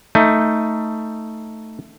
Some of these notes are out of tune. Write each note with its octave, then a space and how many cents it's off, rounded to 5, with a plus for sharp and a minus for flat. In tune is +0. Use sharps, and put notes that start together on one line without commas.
A3 +10 D#4 +10